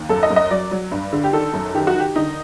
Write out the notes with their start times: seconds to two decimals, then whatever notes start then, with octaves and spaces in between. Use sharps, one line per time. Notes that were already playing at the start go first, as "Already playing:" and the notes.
Already playing: D#2
0.09 F#2 A4
0.23 D#5
0.30 F#2
0.36 D#5
0.51 F#3 D5
0.71 F#3
0.91 G2
1.13 D3
1.24 G4
1.33 D#3 A4
1.54 F#2
1.75 D#3 G4
1.87 F#4
1.95 D#3 G4
2.16 D3 D#4